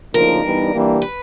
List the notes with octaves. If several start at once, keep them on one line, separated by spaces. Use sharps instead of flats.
D2 C#3 F3 A#3 D#4 A#4
G2 E3 G3 B3 D#4
E3 G3 A#3 D4 G4
B4